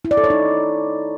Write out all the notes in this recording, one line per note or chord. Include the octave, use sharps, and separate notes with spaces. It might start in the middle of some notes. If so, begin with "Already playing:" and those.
E4
D5
A4
C#5
D#4